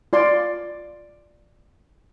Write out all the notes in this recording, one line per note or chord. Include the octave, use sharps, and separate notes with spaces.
F4 D5 C6